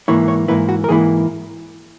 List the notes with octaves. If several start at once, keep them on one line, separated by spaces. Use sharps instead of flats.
G#2 E3 A#3 E4 C#5
C#5
G#2 E3 A#3 E4 B4
F#4
A#4
G#2 E3 A#3 E4 G#4